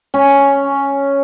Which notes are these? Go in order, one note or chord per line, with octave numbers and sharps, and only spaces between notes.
C#4